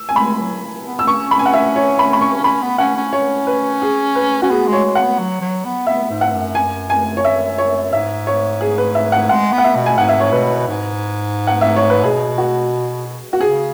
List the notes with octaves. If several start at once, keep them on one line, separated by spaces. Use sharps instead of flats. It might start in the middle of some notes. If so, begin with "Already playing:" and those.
Already playing: E6
G#5
G#3 B5
F#3
B3
E6
C#4 C#6
B5
G#5
F#5
E5
C#5
B5
B5
C#6
C#4 B5
B3
C#4 F#5
C#4
C#5
B4
G#4
B4
C#4 F#4
B3 G#4
G#3
C#5
G#3
F#5
B3
F#3
F#3
B3
B3 E5
G#2
F#5
F#2
G#5
G#5
C#5
E5
C#5
G#2 E5
C#5
G#4
B4
E5
F#5
G#3 F#5
B3
F#5
E5
B2
G#5
G#2 F#5
E5
C#5
B2 B4
G#2
F#5
E5
C#5
B4
B2 G#4
F#4
F#4
C#3 G#4